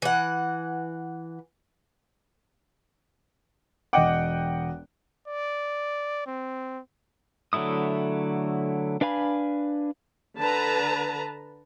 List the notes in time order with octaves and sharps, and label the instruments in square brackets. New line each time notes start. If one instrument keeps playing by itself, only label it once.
[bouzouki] E3 F#5
[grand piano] E1 D#5 D6 [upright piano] F#5 G5 F#6
[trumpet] D5
C4
[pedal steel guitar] D3 F#3 A3 E4 D#6
D4 B4 F5 G#5 B5
[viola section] D3 B4 A5 A#5